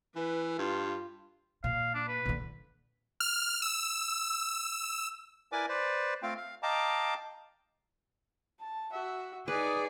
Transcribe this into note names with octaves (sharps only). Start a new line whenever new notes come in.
E3 B4
G2 F4
A#2 F5
D4
B4
A#2 D3
F6
E6
E4 A#4 B4 D5 G#5 D6
B4 C5 D5
A3 C4 F4 F5 G5
F5
D#5 F5 G5 A5 A#5 D6
A5
F#4 E5
D#4 G#4 B4 D5